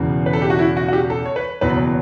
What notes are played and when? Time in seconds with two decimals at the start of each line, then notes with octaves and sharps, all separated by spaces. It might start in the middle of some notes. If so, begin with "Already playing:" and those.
Already playing: E1 E2 C#3
0.26 B4
0.33 A4
0.42 G4
0.50 F#4
0.59 E4
0.77 F#4
0.88 F#4
0.93 G4
1.10 A4
1.26 C#5
1.36 B4
1.61 F#1 E2 B2 F#3 B4